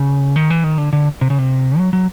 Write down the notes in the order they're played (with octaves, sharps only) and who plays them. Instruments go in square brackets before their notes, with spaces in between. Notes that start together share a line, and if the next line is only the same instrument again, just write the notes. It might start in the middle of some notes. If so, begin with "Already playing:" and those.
Already playing: [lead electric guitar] C#3
D#3
E3
D#3
D3
D3
C3
C#3
C3
F#3
F#3